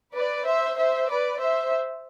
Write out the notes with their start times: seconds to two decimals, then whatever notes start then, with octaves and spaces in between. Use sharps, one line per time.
0.15 B4 D5
0.46 C5 E5
0.78 C5 E5
1.09 B4 D5
1.40 C5 E5